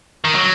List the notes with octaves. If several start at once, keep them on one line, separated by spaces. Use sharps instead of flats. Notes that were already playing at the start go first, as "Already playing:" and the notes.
D#3
F#3